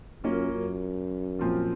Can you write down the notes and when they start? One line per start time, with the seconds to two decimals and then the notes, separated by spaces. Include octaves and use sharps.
0.24 F#2 A#3 C#4 F4
0.53 F#2
1.39 A#2 F3 C4 F4